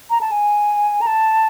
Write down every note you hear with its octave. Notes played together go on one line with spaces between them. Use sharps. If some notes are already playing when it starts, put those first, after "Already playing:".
A#5
A5
G#5
A#5
A5